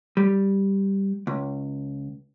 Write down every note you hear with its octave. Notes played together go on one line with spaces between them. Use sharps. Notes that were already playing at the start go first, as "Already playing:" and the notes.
G3
C#2